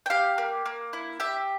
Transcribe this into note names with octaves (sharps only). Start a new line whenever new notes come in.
G5
G4 F5
A#3
A#3
E4
G4 E5